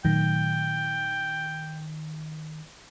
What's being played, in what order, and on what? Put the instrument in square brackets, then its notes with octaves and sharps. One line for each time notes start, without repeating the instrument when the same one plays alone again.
[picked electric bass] A#2 F#3 A3 [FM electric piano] D#3 [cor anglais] G5